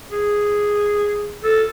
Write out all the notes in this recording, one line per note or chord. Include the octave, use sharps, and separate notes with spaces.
G#4
A4